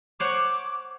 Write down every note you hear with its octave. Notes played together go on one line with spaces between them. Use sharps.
C5 C#5 F#5 D6